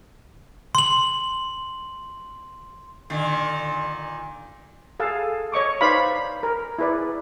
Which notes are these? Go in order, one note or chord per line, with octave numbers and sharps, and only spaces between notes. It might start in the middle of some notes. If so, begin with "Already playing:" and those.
C6 F#7
A#2 D3 D#3
G#4 A4 F5 A5
C#5 D#5 C#6 D6
D#4 B4 C5 D5 F5 B5
A#4
E4 G#4 B4 D5